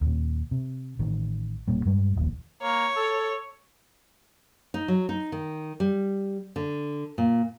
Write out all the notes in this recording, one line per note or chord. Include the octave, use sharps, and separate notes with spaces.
D#2 A#2
C3
A1 D#3
E1 A#2 G3
G2 G3 G#3
D#1 A#1 D#2
A#3 C#5
A4
D#4
F#3
D#4
D#3
G3
D3
A#2